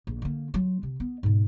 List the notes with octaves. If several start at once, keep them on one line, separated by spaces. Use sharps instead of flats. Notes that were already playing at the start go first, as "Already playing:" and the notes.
A#1
D3 A#3
F#3 F4
C3
B3
G#2 B2